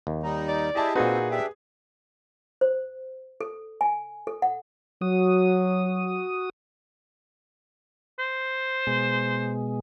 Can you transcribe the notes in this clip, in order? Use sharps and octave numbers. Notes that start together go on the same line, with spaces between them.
D#2
G3 D#4
D5
E4 G4 G#4 D#5 A5
A#2 C4 D#4 F#4 G#4 B4
D4 G4 E5
C5
A4
G#5
A4
F#5
F#3 F#4 D#6
C5
B2 G#3